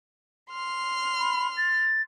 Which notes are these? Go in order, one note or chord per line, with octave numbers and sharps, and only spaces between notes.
C6 F6
B5
A6